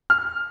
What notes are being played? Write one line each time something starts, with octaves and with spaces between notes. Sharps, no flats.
F6